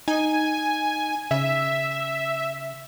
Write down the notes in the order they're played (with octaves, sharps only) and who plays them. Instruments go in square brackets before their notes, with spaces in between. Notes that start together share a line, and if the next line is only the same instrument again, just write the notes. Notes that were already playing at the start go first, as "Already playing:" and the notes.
[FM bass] D#4 [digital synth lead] G#5
[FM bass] C#3 [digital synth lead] E5